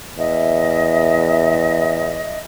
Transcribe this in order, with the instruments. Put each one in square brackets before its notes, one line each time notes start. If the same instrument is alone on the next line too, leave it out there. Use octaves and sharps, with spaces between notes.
[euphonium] E2 [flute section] D#5 E5